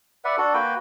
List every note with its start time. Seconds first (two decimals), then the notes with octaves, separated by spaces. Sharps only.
0.25 B4 D5 E5 F#5
0.38 D4 F#4 A4
0.54 A#3 F#4 B4 G5